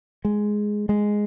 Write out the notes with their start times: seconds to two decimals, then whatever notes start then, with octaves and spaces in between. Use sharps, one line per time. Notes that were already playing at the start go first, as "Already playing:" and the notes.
0.25 G#3
0.89 G#3